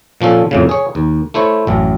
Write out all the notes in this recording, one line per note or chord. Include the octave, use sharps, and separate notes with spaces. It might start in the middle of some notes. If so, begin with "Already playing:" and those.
A#2 F3 C#4 A4
F2 A2 C#3
G#4 C#5
D#2
A3 E4 C5 C#5
A1 F#2